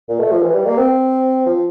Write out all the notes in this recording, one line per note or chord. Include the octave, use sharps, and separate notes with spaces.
A#2
A3
F3
E3
G3
A#3
C4
F3